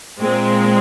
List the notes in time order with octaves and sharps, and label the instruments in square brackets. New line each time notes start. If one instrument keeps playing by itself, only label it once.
[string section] A#2 G#3 C4